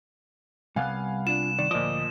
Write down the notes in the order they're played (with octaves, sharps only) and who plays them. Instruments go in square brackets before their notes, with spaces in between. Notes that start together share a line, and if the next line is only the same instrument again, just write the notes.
[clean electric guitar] C2 B3 [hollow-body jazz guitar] G3 [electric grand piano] F5 F#5 G#5
[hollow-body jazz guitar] D4 F4 [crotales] E7
[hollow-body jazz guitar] D#3 [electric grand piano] D5
[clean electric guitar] D2 D#5 [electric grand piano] A#2 F3 [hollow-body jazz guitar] D5